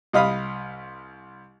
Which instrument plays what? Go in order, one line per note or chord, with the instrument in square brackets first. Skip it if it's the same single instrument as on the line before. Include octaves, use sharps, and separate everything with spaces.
[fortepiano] C2 D#5 F5 B5 D#6